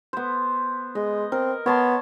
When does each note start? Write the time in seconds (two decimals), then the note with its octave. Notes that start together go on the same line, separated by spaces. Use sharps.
0.13 B3 C5
0.95 G#3 D#5
1.32 C4 A#4
1.66 B3 C#5 A5 C6